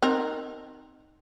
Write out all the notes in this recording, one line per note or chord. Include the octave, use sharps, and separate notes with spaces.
C4 D#4 A#4